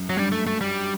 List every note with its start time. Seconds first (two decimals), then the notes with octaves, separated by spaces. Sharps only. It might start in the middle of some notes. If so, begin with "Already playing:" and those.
Already playing: F#2
0.09 F#3
0.16 G2 G3
0.32 A3
0.46 A3
0.61 G3